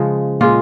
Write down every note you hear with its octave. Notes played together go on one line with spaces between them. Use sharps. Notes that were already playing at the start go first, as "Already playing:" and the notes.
Already playing: C#3 F3 G#3
A#2 G#3 F4